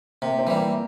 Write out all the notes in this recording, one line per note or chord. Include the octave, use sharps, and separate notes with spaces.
C3 A#3
C4
E3 G3
A#3